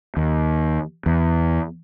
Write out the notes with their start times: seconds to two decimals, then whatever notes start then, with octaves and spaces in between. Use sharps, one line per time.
0.17 D#2
1.06 E2